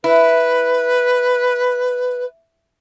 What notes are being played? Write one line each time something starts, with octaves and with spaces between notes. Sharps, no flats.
E4 B4